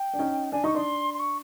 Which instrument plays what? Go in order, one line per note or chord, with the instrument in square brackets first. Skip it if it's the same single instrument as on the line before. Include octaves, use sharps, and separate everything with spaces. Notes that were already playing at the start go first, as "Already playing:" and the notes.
Already playing: [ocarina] G5
[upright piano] D4
C#4 D#4
[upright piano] D4 [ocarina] G#5
[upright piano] D#4 [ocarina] C#6
[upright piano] D4 [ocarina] C6
[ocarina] C6
C#6